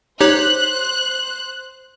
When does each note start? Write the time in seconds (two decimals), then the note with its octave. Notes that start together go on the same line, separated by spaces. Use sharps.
0.21 D#4 G4 C5 C#5 F#6